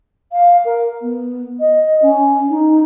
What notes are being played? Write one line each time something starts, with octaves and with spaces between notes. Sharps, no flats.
F5
A#4
B3
D#5
C#4
D#4